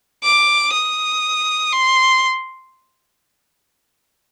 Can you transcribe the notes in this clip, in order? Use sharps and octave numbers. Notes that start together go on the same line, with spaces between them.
D6
D#6
C6